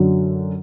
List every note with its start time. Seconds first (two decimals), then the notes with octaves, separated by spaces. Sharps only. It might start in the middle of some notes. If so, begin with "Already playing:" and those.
Already playing: F#2 D3 F#3